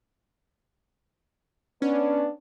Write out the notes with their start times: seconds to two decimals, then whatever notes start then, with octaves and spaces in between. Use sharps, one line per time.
1.82 B3 C#4 D4